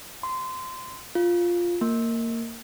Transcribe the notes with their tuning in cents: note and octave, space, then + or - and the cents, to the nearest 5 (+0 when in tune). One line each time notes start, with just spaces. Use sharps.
C6 -20
F4 +0
A#3 -20